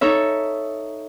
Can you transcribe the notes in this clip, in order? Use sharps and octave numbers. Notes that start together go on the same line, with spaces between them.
D#4 A4 C#5 E5